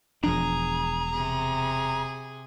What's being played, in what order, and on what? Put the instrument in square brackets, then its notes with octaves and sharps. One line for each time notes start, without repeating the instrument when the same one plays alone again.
[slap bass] E1 F3 D4 [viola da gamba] G#4 [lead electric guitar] A#5
[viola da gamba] C3 G#4